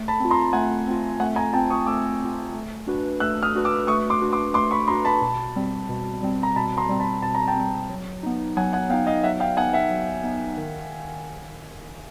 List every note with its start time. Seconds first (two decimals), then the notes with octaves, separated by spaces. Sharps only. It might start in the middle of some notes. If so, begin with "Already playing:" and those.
Already playing: A3
0.08 A5 B5
0.20 C4 F4
0.31 A#5 C6
0.53 A3 F#5 G#5
0.87 C4 F4
1.20 A3 F#5 G#5
1.36 G#5 A#5
1.53 C4 F4 G5 A5
1.70 C#6 D#6
1.86 A3 D6 E6
2.21 C4 F4
2.54 A3
2.87 D4 F#4 B4
3.20 A3 E6 F#6
3.43 D#6 F6
3.55 D4 F#4 B4
3.65 D6 E6
3.87 A3 C#6 D#6
4.10 C6 D6
4.21 D4 F#4 B4
4.33 C6 D6
4.54 A3 C6 D6
4.71 B5 C#6
4.88 D4 F#4 B4 A#5 C6
5.05 A5 B5
5.21 B2
5.56 G3 C4
5.89 B2
6.22 G3 C4
6.43 A#5
6.56 B2 A5 B5
6.77 A#5 C6
6.89 G3 C4
7.00 A5 B5
7.22 B2 A5
7.35 A#5
7.48 G5 A5
7.56 G3 C4
7.89 F#3
8.23 B3 D#4
8.57 F#3 F#5 G#5
8.73 F#5 G#5
8.89 B3 F5 G5
8.93 D#4
9.06 D#5 F5
9.23 F#3 E5 F#5
9.40 F5 G5
9.57 B3 D#4 F#5 G#5
9.74 E5 F#5
9.90 F#3
10.23 B3 D#4
10.57 D#3